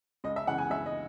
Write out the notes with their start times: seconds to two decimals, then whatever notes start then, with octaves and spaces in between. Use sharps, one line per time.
0.24 C#2 D#5
0.36 E5
0.47 C#3 E3 F#5
0.58 G#5
0.70 C#2 E5
0.86 D#5